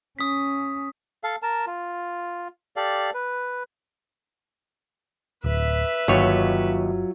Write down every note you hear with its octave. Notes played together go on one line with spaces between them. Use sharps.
C#4 D#6 B6
A4 F5
A#4 A5
F4
G4 A4 D5 F5
B4
D1 B4 E5
G1 D#2 F#3 F4 C#5